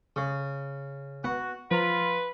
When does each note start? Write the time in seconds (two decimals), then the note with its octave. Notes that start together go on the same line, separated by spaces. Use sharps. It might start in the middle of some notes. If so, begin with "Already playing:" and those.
0.16 C#3
1.24 B3 F#4 F#5
1.71 F3 F4 B4 A#5 B5